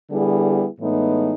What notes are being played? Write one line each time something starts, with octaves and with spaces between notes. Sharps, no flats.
D3 G3 B3 E4 G#4
A2 E3 G#3 B3 D#4